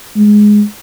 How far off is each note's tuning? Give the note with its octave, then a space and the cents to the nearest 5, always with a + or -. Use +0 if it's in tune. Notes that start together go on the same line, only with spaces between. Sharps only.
G#3 +5